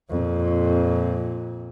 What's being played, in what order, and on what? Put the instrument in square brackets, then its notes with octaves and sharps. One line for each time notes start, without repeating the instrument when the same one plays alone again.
[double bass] F2 A#2